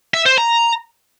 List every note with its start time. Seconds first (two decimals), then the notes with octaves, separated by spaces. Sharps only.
0.14 E5
0.26 C5
0.38 A#5